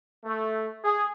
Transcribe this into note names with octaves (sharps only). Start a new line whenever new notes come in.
A3
G#4